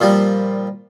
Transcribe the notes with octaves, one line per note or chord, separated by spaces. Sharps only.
A#2 F3 G3